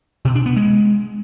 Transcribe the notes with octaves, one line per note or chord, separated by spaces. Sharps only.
B2
D4
B3
G#3